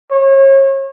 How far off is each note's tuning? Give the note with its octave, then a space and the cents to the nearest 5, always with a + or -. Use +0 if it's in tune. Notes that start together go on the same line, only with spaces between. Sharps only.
C#5 -35